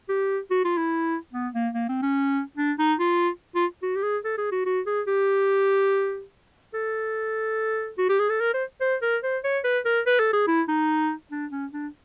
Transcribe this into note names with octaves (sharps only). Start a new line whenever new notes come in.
G4
F#4
F4
E4
B3
A#3
A#3
C4
C#4
D4
D#4
F4
F4
F#4
G4
G#4
A4
G#4
F#4
F#4
G#4
G4
A4
F#4
G4
G#4
A4
A#4
C5
C5
A#4
C5
C#5
B4
A#4
B4
A4
G#4
E4
D#4
D4
C#4
D4